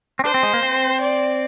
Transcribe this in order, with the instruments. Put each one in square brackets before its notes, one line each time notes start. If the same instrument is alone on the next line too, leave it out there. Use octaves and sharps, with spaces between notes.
[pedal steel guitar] C4
[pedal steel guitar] D4 [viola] C5
[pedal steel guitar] C4
G#3
A#3
C4
[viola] D5